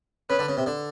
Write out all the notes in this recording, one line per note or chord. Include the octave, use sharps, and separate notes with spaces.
C#3 B4
D3
C#3
C3
D3